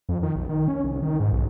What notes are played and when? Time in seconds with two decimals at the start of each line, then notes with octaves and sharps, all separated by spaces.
0.09 F2
0.23 D#3
0.36 B1
0.49 D#3
0.68 C#4
0.84 C2
1.02 D#3
1.20 G#2
1.32 B1